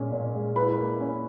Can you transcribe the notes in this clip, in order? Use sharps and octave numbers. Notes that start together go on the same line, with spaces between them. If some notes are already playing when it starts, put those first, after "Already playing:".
Already playing: A#2 G#3 C#4
A#2
G#3
E4 B4 B5
A#3
C#4